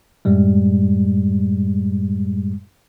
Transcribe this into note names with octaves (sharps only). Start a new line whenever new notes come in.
F#2 A2 G3 G#3